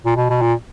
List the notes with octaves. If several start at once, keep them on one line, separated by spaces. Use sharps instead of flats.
A#2
B2
B2
A#2